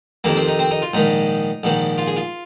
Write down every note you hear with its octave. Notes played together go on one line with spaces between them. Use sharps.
F2 C3 D#3 A#3
C4
D#4
C4
D#4
F4
A#1 G#2 D#3 D#4
A#1 G#2 D#3
F4
G#4
F4